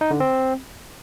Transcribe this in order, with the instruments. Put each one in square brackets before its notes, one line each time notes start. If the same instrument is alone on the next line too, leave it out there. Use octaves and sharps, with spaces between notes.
[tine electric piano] D#4
D3
C4